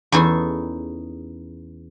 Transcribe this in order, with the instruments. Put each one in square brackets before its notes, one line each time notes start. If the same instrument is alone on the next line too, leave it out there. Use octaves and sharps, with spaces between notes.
[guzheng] E2 C#4 D#4 G#4 A4 G#5